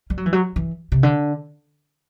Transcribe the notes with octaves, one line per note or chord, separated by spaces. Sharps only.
G3
F#3
E3
F#3
E3
C3
D3